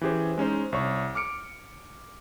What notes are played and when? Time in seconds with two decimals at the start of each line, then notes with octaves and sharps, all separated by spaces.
0.01 E3 C#4 G4 G#4 C5
0.38 G#3 C#4 D#4 C5
0.72 C2 C#5 C#6
1.15 D6 F6 C#7 D7